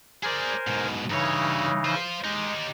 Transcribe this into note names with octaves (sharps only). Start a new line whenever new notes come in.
G#4 A#4 C5 D5 G#5
G#2 B2
G2 C#3 E3 D#4 C#5
F4 C5
G#3 D#4 G4